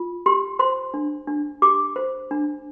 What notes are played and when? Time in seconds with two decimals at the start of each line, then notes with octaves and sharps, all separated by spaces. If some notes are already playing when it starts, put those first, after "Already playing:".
Already playing: F4
0.26 G4 C6
0.59 C5 C6
0.94 D4
1.28 D4
1.62 G4 D6
1.96 C5
2.31 D4